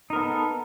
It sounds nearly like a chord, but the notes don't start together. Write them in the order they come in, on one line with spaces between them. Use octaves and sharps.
D#4 A#4 B3 A4